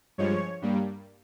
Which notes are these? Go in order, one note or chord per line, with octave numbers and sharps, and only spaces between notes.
G2 F3 G#3 C#5
G2 G3 A#3